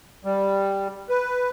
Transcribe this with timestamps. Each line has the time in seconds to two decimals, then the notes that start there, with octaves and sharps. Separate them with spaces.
0.25 G3
1.09 B4